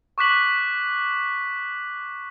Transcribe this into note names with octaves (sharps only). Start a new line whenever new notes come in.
C#6 D6 F#6 B6 F#7